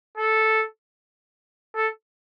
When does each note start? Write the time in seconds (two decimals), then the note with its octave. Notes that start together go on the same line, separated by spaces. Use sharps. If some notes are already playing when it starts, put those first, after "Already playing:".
0.18 A4
1.76 A4